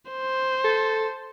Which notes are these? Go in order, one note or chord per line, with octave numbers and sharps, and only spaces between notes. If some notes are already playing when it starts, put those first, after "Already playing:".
C5
A4